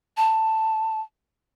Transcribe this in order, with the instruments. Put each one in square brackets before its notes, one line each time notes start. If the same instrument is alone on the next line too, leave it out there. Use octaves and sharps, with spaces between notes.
[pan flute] A5